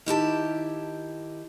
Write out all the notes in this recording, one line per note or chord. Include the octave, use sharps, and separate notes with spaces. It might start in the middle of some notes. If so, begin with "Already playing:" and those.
D#3 E4 G4 A5